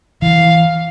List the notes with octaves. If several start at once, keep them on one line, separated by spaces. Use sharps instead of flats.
E3 F5